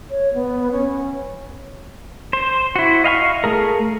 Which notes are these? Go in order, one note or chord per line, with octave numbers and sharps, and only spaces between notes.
C#5
B3
C#4
C5
E4 F#4
D#5 F5 G5 C#6
A3 G#4 A#4